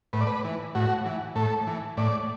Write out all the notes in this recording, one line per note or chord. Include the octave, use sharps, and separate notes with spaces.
A2 B4
D5
B4
E3
A2 F#4
E3
A2 A4
E3
A2 D5